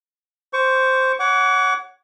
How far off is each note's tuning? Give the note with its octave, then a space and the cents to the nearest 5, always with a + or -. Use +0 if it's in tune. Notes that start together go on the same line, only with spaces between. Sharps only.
C5 +0 C#6 +20
C#5 +0 F#5 +0 D6 -40